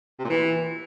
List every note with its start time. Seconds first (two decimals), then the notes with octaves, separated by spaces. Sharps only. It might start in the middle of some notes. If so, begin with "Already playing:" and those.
0.19 C3
0.24 A#2
0.30 E3